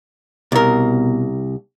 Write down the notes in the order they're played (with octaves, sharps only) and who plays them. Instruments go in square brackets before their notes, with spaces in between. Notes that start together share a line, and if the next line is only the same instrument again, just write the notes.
[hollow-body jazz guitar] C2 A#4 [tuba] B2